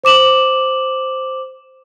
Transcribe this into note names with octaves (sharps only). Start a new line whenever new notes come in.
C5 D6 E7 F#7